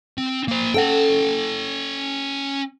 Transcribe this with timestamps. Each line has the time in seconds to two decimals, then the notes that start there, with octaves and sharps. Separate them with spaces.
0.18 C4
0.48 A#3 C5
0.74 C#4 A4 F#5 G5